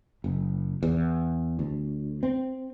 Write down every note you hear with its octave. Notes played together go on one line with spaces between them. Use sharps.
F#1
E2
D2
C4